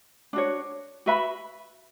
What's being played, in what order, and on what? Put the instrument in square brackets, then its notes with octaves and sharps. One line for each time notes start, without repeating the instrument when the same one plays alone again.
[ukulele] D4 F#4 C#5
F#4 B4 E5 B5